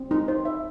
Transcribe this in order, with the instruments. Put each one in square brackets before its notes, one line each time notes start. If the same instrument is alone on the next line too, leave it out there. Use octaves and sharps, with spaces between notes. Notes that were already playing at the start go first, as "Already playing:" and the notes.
Already playing: [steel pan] C4
D#4
C5
E5